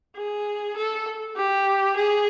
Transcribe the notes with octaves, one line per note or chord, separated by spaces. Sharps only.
G#4
A4
G4
G#4